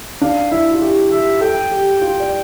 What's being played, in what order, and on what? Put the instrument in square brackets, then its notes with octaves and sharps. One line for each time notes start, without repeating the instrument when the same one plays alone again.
[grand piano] D4 [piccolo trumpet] F5
[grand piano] E4 [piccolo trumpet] E5
[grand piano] F4
G4
[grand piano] G4 [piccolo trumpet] E5
[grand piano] A4 [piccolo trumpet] G5
[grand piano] G4
F4
D5